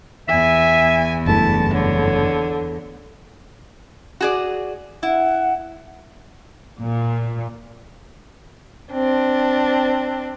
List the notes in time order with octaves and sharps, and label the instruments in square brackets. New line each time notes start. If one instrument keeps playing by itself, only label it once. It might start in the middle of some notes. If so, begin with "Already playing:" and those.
[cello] E2 [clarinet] E5 [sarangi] G#5
[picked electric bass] F#1 G2 A3 [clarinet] E4 [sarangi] A5
[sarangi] D3 [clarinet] C#5
[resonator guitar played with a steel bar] F#4 G#4 D5
[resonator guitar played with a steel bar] E4 [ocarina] F#5
[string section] A#2
[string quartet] C4 D4